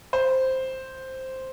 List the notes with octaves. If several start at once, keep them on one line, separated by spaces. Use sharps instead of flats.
C5